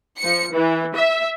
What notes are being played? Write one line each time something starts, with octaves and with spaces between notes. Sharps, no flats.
F3 C#7
E3
E5